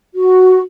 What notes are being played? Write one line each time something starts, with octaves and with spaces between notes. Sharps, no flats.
F#4